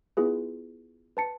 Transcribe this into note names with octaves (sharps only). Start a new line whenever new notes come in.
B3 E4 F4 G#4 B4
B4 A5 C#7